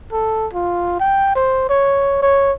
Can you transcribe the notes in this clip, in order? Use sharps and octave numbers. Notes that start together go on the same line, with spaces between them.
A4
F4
G5
C5
C#5
C#5